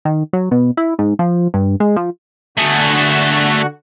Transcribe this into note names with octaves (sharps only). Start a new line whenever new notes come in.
D#3
F#3
B2
E4
G#2
F3
G2
G#3
F3
D3 A3 F#4 G#4